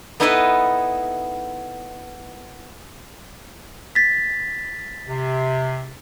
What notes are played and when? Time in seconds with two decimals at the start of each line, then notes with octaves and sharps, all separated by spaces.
0.20 B3 D#4 E4 A4 B4 D#5
3.95 A6 B6
5.07 C3